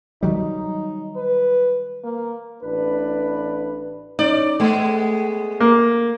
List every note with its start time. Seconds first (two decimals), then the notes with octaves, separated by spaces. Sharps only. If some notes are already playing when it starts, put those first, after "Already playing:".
0.23 D#3 F#3 G3 D#4
1.16 B4
2.04 A#3
2.63 A1 D4 B4
4.19 C#4 D#4 D5
4.60 G#3 A3 B3
5.60 A#3